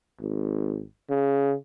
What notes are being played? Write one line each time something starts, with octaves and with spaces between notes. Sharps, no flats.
G#1
C#3